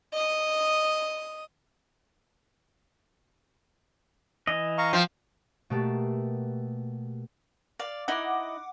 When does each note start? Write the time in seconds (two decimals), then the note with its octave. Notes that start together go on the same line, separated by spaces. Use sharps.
0.13 D#5 D#6
4.47 E3 D#5
4.78 F5 A#5 C#6
4.93 F3 F5 G5
5.70 B2 A3 A#3 G4 A4 B4
7.79 D5 F5
8.08 D#4 E4 D#5 F#5 D6